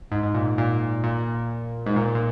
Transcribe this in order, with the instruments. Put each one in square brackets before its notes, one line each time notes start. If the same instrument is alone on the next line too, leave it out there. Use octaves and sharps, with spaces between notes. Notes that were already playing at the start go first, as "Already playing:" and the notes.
[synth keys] G#2
G#2
A#2
A#2
A#2
G#2
A#2
A#2